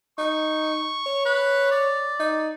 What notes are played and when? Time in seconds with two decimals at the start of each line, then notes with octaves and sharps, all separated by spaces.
0.18 D#4 C#6
1.06 C#5
1.25 B4
1.71 D5
2.19 D#4